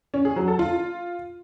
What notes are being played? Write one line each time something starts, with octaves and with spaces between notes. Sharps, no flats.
C#4
G#4
F#3
A4
F4